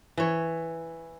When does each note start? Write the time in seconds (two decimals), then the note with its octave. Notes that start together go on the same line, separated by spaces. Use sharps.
0.17 E3 C#5